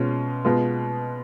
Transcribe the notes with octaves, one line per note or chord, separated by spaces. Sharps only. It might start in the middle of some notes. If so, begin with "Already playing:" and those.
Already playing: B2 G#3 C#4 F4
B2 G#3 B3 F4